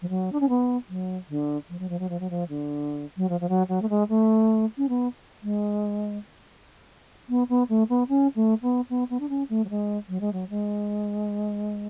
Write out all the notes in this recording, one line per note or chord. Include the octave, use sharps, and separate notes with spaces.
F3
F#3
D4
C#4
B3
F#3
D3
F3
F#3
F3
F#3
F3
F#3
F3
D3
F#3
F3
F3
F#3
F#3
A3
G#3
A3
C#4
B3
G#3
B3
B3
A3
B3
C#4
A3
B3
B3
B3
D4
C#4
A3
F#3
G#3
F#3
G#3
F#3
G#3